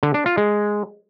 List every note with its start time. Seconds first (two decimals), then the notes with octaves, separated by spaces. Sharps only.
0.03 D3
0.14 D4
0.26 F4
0.37 G#3